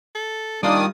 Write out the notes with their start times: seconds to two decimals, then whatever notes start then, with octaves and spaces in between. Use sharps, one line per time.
0.15 A4
0.63 D#3 G3 A#3 D4 F4 D5 F5 D#6